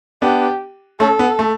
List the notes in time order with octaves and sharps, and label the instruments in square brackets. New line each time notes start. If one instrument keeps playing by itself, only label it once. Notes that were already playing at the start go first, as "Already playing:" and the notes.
[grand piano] B3 D4 [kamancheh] G4
[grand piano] A3 C#4 [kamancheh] A4
[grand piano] B3
A3